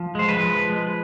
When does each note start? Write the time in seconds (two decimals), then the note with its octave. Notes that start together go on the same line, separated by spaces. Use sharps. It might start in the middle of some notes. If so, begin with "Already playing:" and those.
Already playing: F3
0.15 G#3 C5
0.29 B4
0.43 F3
0.70 G#3